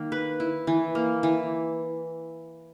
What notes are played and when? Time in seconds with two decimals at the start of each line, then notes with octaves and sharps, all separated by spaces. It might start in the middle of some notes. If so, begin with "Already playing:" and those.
Already playing: D#3 A#3
0.12 B4
0.40 E4
0.67 E3
0.95 A#3
1.23 E3